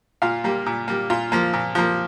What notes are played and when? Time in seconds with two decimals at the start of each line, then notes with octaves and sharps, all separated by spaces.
0.22 A#2 F4 F5
0.44 G3 A#3
0.66 A#2
0.88 G3 A#3
1.10 A#2 F4
1.32 F3 A#3
1.53 A#2
1.75 F3 A#3